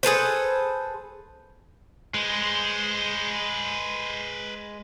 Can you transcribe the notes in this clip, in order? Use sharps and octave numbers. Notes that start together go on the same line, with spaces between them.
G#4 A4 B4 C5
G#3 B4 C5